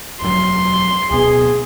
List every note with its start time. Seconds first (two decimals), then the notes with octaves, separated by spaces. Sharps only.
0.22 E1 F#2 F#3 C6
1.11 D1 B2 B3 G#4